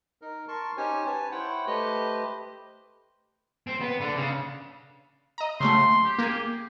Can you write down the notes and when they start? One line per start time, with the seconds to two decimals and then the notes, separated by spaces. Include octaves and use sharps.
0.22 D#4 A#4
0.48 A#4 A5 C6 C#6
0.77 C#4 D#4 G4 C5 C#5 G#5
1.06 B4 G#5 A5
1.31 E4 C5 C#5 F#5 G5
1.67 A3 G4 B4 C5 D#5
3.67 C4
3.81 B3
4.01 D3
4.16 C#3
5.38 D#5 A#5
5.60 C#3 F#3 A3 C6
6.05 G4
6.19 A#3 G#4